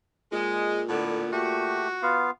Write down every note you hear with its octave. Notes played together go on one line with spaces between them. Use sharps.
A#2 G#3
A2 D3 B3
A3 F#4 G4
B3 F4 F5